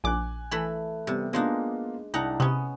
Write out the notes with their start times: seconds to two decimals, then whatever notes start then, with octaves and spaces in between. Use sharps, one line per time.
0.04 A#1 G#5 D6 F#6
0.51 E3 A3 B5
1.07 C3 G3 B3
1.33 G#3 A#3 B3 D4 D#4 F4
2.14 C2 D4 D#4 F#5 A5 A#5
2.40 C3 B3 C#4 D#6